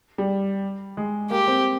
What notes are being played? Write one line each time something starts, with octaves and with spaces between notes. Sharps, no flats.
G3
G#3
A#3 G4
C4